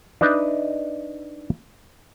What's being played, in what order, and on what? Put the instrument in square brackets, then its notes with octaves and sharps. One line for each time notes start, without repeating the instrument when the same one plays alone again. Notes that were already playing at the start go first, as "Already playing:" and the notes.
[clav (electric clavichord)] D4 D#4 B4 D#5 E5